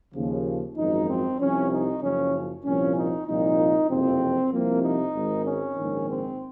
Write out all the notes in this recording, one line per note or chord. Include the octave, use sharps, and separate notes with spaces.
D#2 C#3 F3
G#1 F#2 F3 D#4
C4
C2 C3 F3 C#4
D#4
F#1 F#2 C#3 F3 C#4
C2 A#2 F3 C#4
D#4
C2 A#2 F3 D#4
F#1 F2 C3 F3 C4
C2 C3 F3 A#3
D#4
G#1 G#2 D#3
C#4
A#1 G#2 D#3
C4